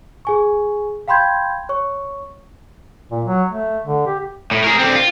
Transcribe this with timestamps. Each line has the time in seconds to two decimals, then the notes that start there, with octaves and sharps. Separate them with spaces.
0.25 G#4 G#5 C#6
1.08 F5 G5 B5 C6 G6 G#6
1.69 C#5 C#6
3.11 A#2
3.25 F#3
3.51 A3
3.85 D3
4.06 G4
4.51 A2
4.64 G#4 A#4
4.79 D3 C4
4.95 F4